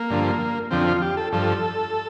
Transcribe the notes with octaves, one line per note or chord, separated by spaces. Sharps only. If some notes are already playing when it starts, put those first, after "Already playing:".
Already playing: A#3
G2 D3 F3
F2 D3 F3 C4
F4
G4
A4
G2 F3 A4